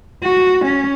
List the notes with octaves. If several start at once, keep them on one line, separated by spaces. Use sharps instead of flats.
F#4
C#4